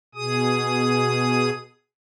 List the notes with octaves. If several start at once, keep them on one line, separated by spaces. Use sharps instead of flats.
B2 G#4 D#6